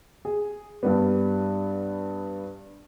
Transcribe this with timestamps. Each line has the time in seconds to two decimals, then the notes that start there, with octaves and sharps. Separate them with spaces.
0.25 G#4
0.83 G2 G3 B3